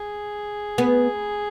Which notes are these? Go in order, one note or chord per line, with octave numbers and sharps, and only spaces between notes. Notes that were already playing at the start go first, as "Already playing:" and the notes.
Already playing: G#4
B3